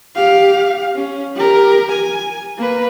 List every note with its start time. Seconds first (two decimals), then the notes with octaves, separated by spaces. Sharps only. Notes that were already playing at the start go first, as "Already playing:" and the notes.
0.15 G4 F5
0.95 C#4
1.35 G4 A#4
1.93 G#5
2.57 A#3 B4